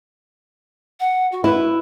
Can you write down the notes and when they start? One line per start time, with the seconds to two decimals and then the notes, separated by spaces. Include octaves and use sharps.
1.00 F#5
1.32 F#4
1.44 E4 B4